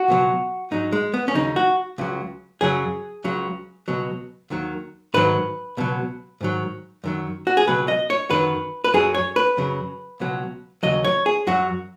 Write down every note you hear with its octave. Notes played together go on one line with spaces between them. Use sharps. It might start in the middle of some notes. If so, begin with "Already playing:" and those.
Already playing: F#4
C#2 B2 F#3
G#2 F#3 D#4
G#3
B3
C#4
D#2 C#3 F#3 D#4
F#4
C#2 C#3 F#3
F#2 C#3 F#3 G#4
C#2 C#3 F#3
C#2 B2 F#3
D#2 D#3 F#3
G#2 D#3 F#3 B4
C#2 B2 F#3
G#2 D#3 F#3
F#2 D#3 F#3
F#4
G#4
C#2 B2 F#3 B4
D#5
C#5
F#2 D#3 F#3 B4
B4
F#2 F#3 G#4
C#5
B4
F#2 C#3 F#3
C#2 B2 F#3
D#2 C#3 F#3 D#5
C#5
G#4
F#2 F#3 F#4